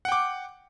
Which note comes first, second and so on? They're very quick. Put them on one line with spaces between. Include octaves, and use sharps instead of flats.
F#5 G5 D6